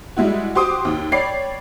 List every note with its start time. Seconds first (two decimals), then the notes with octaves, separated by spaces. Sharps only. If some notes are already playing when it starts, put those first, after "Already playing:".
0.16 G3 G#3 E4 F#4
0.55 F#4 G4 C5 C6 D6 D#6
0.85 D#2
1.12 C#5 D5 G5 B5 C7